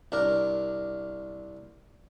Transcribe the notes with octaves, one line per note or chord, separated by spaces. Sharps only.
C2 D4 A#4